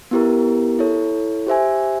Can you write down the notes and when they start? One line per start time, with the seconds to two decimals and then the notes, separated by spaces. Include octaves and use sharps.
0.11 B3 E4 G4 A#4
0.79 E4 A4 C#5
1.47 G4 C5 E5 G#5